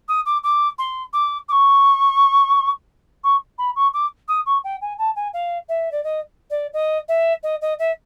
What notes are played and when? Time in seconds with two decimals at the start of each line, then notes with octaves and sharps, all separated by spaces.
0.09 D#6
0.26 D6
0.44 D6
0.79 C6
1.13 D6
1.49 D6
1.52 C#6
3.24 C#6
3.58 B5
3.76 C#6
3.94 D6
4.28 D#6
4.46 C#6
4.64 G5
4.81 G#5
4.98 A5
5.16 G#5
5.34 F5
5.69 E5
5.92 D5
6.04 D#5
6.50 D5
6.73 D#5
7.09 E5
7.43 D#5
7.62 D#5
7.79 E5